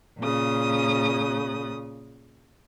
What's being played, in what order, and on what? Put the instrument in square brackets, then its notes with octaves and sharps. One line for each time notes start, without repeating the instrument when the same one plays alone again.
[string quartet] A#2 C#3 D#6